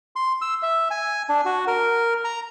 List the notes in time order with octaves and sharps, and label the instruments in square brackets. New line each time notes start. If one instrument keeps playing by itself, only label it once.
[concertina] C6
E6
E5
G#5
D4
F#4
A#4
A#5